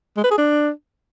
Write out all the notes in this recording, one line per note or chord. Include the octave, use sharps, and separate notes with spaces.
G#3
B4
G#4
D4